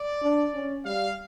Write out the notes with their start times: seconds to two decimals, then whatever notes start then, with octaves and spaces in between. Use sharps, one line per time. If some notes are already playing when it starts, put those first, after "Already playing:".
Already playing: D5
0.22 D4
0.54 C#4
0.85 G3 F5